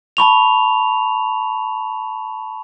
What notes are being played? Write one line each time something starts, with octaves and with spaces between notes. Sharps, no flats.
A5 B5 C#6 F7